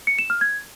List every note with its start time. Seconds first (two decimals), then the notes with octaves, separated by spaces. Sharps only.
0.07 C#7
0.19 E7
0.30 F6
0.41 G#6